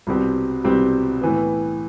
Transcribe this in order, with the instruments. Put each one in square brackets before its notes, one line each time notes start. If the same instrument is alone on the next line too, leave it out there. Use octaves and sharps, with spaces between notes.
[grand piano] C2 B2 G3 C4 G4
C2 B2 G3 C4 G4
A2 E3 B3